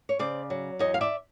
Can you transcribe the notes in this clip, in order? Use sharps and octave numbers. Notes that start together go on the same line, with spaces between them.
C#5
C#3 C5 D5
F#3
E2 C#5 D#5
F5
D5 E5